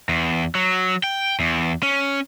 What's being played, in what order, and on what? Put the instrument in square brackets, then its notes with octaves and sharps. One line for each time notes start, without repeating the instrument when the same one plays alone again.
[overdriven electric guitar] E2
F#3
G5
E2
C#4